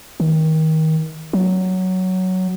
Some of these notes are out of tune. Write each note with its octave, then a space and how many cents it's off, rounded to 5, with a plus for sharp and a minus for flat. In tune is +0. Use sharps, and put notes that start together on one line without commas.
D#3 +25
F#3 +5